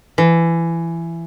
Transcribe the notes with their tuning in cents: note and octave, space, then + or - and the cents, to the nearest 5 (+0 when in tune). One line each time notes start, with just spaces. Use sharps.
E3 +20